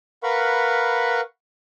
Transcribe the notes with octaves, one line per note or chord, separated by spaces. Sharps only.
A#4 B4 F5 F#5 B5 C#6